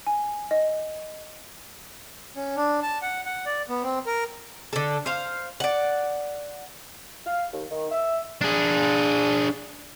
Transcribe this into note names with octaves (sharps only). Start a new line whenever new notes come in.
G#5
D#5
C#4
D4
A5
F#5
F#5
D5
B3
C4
A#4
D3 A4
C5 F5
D5 F#5
F5
D#2
D#3
E5
D4 G#4